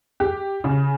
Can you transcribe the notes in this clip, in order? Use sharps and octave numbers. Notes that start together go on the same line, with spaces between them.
G4
C#3